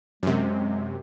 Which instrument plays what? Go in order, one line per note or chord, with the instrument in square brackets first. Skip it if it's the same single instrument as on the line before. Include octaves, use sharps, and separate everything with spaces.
[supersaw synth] F#2 C3 [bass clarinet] G#3